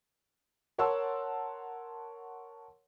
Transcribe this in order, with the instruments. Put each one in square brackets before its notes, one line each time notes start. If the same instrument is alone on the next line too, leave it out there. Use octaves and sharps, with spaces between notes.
[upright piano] A#4 C#5 F#5 A5 C6 E6